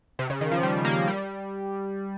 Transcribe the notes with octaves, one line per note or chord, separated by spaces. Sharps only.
C3
C#3
D#3
F3
G3
A#3
G3